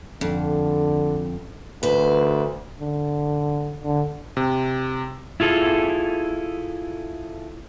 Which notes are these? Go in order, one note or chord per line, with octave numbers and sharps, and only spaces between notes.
F2 D3
D2 B4 C5
D3
D3
C3
E4 F4 G#4 A4